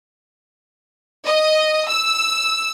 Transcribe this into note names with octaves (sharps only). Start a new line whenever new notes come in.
D#5
E6